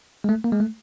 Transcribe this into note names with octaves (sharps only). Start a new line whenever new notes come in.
G#3
A3
A#3
G#3
A3